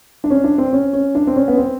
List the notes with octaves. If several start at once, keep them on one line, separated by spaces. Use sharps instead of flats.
D4
C#4
D4
C4
C#4
C#4
D4
C4
C#4
B3
C4